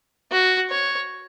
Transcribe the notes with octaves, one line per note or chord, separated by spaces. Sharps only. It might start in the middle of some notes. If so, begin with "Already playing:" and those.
F#4
C#5